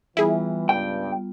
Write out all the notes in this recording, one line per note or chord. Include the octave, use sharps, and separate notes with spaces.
E3 G3 B3 E4 F4 G#4
C#2 G2 G5